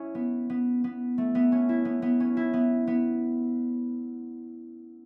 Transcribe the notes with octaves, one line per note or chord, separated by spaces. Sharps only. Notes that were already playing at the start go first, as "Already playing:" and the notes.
Already playing: C#4 E4
B3
B3
B3
A3
B3
C#4
E4
B3
B3
C#4
E4
B3
B3